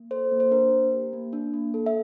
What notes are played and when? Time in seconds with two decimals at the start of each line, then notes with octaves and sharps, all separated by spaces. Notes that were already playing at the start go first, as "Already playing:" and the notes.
Already playing: A#3
0.11 A4 C5
0.31 A#3
0.40 C5
0.51 D4 A#4
0.72 A#3
0.92 G4
1.13 A#3
1.33 D4
1.54 A#3
1.74 A4
1.86 E5